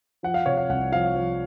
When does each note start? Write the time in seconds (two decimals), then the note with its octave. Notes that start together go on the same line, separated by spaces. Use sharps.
0.23 F3 F#5
0.34 F5
0.46 C3 C#5
0.57 F5
0.69 C2 F#5
0.92 F3 F5
1.15 F3